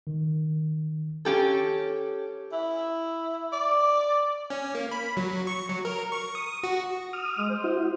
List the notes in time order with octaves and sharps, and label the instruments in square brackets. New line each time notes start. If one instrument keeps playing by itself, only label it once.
[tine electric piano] D#3
[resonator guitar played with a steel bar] C#4 G4 A4
[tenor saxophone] E4
D5
[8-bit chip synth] C#4
A#3
B5
F#3
C#6
F#3
A#4
C#6
D#6
F#4
[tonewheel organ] D#6 F6
[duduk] G#3
C5
[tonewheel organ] E4 F#4